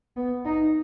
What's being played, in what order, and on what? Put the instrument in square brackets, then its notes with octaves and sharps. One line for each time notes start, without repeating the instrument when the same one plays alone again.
[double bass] B3
D#4